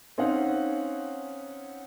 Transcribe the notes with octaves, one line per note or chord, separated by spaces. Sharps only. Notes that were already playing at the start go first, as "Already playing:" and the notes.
C4 C#4 D#4 F5 F#5 G#5